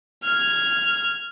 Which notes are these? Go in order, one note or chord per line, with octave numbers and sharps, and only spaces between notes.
F6 G#6